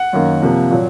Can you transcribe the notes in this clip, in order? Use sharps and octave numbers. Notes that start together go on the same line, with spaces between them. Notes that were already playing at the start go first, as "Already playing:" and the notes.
Already playing: F#5
F#2 D#3 A#3
C3 F3 A#3
A#2 F#3